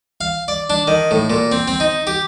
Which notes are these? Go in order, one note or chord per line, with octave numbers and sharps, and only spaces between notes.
F5
D5
D4
D#3
A2
A#2
C4
C4
D#4
G4